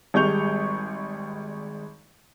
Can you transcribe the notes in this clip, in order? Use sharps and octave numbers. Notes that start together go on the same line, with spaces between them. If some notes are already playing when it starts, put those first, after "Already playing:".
G#1 G3 G#3 C#6 G6 F7